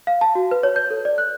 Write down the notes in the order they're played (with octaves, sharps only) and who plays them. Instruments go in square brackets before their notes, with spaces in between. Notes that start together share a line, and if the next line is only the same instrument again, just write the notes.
[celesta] F5
A5
F#4
B4
C#5
G6
A4
D5
F#6